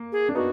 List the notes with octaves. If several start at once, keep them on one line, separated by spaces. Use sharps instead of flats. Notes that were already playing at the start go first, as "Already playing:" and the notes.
Already playing: A#3
G#4
D4
B3 D#4 F#4